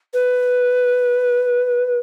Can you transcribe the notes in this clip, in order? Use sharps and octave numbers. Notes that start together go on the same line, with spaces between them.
B4